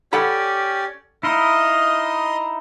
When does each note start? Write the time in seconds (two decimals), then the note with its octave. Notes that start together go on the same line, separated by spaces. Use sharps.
0.13 C#4 G4 A4 D5 F#5 B5
1.23 D#4 E4 D#5 F5 C6 D#6